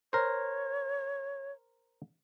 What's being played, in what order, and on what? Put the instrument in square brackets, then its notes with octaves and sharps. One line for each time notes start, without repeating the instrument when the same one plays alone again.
[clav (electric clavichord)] A#4 C5 [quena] C#5